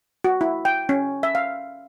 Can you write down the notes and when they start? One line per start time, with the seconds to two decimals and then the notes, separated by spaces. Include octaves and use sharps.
0.24 F#4
0.41 E4
0.65 G5
0.89 C#4
1.23 E5
1.35 F5